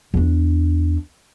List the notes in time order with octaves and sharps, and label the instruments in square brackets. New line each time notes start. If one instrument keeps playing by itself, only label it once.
[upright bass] E2 D4